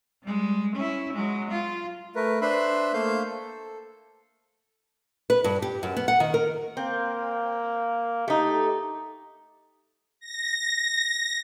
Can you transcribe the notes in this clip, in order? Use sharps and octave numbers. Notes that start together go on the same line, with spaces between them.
G3 G#3
C#4 E4
F#3 G#3
F4
A3 A#4 B4
D4 B4 C5 E5 B5 C6
A3 A#3 C5 F5 G6
A4
B4
G2
G4
F#2
B3
F#5
D#3
A#4
A#3 C4
A3 D#4 G4
A#6